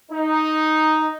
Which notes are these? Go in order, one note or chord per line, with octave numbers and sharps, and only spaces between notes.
D#4